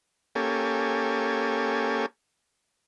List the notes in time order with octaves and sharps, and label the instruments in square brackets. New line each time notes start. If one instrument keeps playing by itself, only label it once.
[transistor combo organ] A#3 C#4 G4 A4 G#5